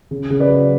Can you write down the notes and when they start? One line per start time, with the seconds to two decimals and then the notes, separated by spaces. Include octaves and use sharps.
0.11 C#3
0.30 C#3
0.40 B4 D5
0.49 F#3